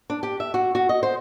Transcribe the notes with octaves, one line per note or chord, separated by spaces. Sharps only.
D4
G4
E5
F#4
F#4
D#5
C5